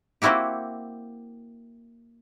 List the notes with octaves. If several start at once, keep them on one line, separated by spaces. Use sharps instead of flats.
A#3 C4 E4 F#4 G4